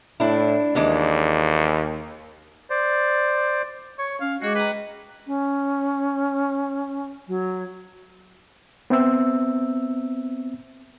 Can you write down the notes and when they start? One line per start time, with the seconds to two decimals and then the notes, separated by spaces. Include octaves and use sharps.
0.20 A2 D4 E4
0.75 D#2 E3 G#3 D4
2.70 C5 D5
3.99 C#5 C#6
4.21 C#4 F5
4.42 G#3 F#4 G#4 D#5 D6
4.55 B4 G5 A#5
5.27 C#4
7.28 F#3
8.90 B3 C4 E5 E6